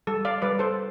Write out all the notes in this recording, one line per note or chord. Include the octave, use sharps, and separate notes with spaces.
G3 A4
D5 F5
G3 B4 D5
A4 C5